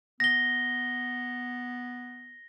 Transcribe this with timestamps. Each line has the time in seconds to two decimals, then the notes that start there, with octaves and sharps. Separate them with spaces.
0.20 B3 A#6 G7